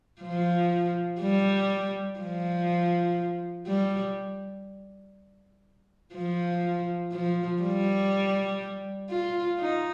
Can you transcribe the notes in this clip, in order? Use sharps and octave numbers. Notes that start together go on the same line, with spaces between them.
F3
G3
F3
G3
F3
F3
G3
F4
D#4